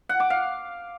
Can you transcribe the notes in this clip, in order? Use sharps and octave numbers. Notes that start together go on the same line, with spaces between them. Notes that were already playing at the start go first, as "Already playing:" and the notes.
F#5
D6
F5